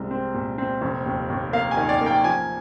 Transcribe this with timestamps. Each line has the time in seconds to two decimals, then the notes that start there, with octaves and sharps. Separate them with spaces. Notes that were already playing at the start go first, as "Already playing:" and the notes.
Already playing: C2 G#3 C4
0.11 C4
0.34 A#2
0.58 C4
0.82 F1
1.06 D#2
1.30 D#2
1.53 A#3 F5
1.71 G#5
1.77 D#3
1.89 D5
2.01 A#3
2.06 G5
2.24 F3 G#5